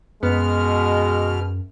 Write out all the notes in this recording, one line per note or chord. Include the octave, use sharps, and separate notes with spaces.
F#2 B2 G#3 B3 F6